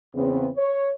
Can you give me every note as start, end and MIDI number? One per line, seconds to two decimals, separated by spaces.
0.14 0.48 40
0.14 0.48 49
0.14 0.48 59
0.14 0.48 60
0.56 0.90 73